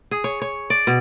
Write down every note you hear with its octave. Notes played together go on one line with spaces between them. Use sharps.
G#4
C#5
C#5
D5
B2